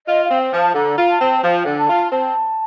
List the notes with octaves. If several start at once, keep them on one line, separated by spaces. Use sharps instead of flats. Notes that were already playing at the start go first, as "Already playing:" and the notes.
F4 D#5
F5
C4
G5
F3
A5
D3 A#5
F4
A5
C4
F3 G5
D3
A5
F4
C4 A5